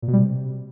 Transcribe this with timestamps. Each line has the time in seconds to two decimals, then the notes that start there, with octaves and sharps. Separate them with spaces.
0.02 A#2
0.08 B2
0.13 G3
0.19 C3